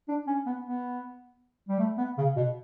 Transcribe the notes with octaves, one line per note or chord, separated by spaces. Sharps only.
D4
C#4
B3
B3
G3
A3
B3
C#3
B2